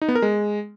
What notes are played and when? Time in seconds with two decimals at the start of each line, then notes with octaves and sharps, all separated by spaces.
0.02 D#4
0.08 B3
0.15 A#4
0.22 G#3